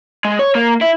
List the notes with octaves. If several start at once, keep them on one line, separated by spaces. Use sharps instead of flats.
G#3
C#5
A#3
E4